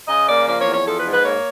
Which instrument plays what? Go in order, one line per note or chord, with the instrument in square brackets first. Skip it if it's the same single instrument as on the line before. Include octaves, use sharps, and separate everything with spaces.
[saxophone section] C#3 D#5
A#3 D5
F3 D5
C#5
E2
C#5
F3 A4
B4
G#2
B4
A#3 C#5